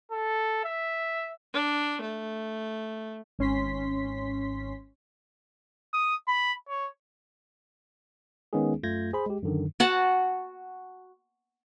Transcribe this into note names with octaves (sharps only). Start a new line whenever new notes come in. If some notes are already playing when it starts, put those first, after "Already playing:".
A4
E5
D4
A3
G#1 C#4 C6 B6
D#6
B5
C#5
D#3 G#3 B3 C#4 D#4 G#4
F#2 A3 F4 G6 G#6 A#6
G#4 C5 B5
G#3 G4
F#2 D3 D#3
F#4 F#5 A5